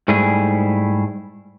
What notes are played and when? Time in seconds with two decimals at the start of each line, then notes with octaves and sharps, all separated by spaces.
0.08 G#2 G3 A3 E4 G#4 G#5